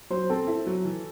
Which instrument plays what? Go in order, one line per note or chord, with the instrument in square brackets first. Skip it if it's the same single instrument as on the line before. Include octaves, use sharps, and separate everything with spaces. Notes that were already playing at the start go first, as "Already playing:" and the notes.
[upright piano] F#3 [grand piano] C5
[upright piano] C4 [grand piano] A4
[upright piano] E4
F#3
E3